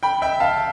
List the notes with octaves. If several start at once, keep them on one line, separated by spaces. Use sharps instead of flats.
G5 B5
E5 G5
F5 A5